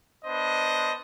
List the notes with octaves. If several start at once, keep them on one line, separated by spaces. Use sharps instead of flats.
B3 D4 C5 D#5